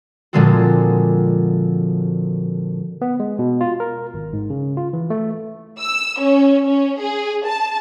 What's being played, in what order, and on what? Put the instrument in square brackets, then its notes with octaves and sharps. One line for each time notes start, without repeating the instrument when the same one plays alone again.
[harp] A#2 D3 F3 G#3 C4 F#4
[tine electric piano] B3
G#3
B2
F4
A#4
G#1
G#2
C#3
F4
E3
A3
[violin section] E6
C#4
C#4
G#4
A5